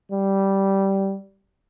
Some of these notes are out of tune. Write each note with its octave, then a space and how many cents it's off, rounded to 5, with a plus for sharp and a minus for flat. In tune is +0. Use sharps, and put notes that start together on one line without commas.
G3 -10